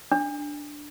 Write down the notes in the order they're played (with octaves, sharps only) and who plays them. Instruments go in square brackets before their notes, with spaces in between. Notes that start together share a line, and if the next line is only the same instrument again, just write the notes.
[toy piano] D4